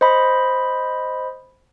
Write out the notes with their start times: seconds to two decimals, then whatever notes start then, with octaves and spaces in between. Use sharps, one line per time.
0.01 C5 D#5 B5